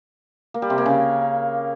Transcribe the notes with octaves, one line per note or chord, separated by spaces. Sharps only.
A#3
G3
C3
A#3
C#3